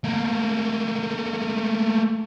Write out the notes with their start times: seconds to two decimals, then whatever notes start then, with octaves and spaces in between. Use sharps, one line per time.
0.04 A3 A#3